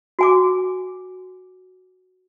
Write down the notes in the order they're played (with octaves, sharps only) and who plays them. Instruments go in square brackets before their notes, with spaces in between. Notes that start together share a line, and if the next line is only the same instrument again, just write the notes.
[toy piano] F#4 G#5 D6